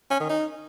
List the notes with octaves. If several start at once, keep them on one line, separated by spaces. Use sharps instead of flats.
C#4
D#3
D#4